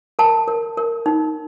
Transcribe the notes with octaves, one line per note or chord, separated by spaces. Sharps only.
A#4 A5
A#4
A#4
D#4